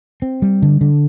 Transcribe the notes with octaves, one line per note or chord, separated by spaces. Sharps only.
C4
G3
D3
D3